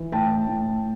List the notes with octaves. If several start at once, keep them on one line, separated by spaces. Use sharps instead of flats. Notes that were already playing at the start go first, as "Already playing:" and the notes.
Already playing: E3
A2 G5 A5
A2